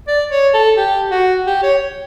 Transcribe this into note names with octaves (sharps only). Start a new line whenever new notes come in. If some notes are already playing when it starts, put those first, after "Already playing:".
D5
C#5
A4
G4
F#4
G4
C#5